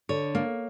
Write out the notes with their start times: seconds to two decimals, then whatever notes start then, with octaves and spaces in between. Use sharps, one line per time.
0.09 D3 C#5
0.35 A#3